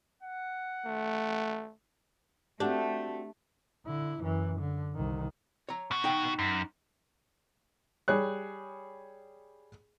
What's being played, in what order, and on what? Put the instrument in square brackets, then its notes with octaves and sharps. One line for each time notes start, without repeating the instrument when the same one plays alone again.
[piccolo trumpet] F#5
[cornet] A3
[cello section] A3 [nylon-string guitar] C4 F#4 D5 [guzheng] D4 [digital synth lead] G4
[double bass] D3 E4
F#2 E3
D3
C2 D#3
[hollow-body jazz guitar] C#5 A#5
[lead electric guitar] B2 F#4
[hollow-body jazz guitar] D#4 G5
[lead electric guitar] F#2
[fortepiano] G3 G#4 C#5 F#6